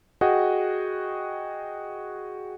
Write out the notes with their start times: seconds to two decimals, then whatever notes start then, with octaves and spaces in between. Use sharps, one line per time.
0.21 F#4 G#4 D#5 F#5 G5